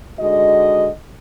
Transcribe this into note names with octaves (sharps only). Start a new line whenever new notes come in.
D3 G#3 D#4 F#4 D#5